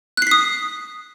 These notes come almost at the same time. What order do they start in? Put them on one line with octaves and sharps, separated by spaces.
F#6 C7 B6 D#6